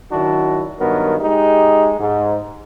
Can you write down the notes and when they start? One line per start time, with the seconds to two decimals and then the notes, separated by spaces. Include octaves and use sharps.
0.12 D#3 F#3 D4 E4 F#4
0.79 G2 D#3 F#3 B3 A#4
1.20 G#3 D#4 G4
2.00 G#2